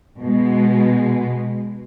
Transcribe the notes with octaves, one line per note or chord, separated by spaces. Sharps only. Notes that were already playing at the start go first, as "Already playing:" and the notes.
B2 G#3